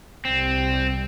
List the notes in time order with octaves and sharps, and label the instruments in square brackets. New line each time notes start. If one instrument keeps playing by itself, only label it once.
[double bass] C2 G3 [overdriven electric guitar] C4